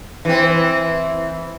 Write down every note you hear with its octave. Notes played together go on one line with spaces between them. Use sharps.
E3 C4